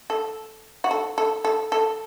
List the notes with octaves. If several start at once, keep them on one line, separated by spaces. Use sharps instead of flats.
A4
F#4
A4
A4
A4
A4